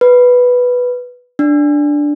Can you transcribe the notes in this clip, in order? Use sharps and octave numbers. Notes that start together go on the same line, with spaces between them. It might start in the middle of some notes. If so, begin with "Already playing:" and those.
B4
D4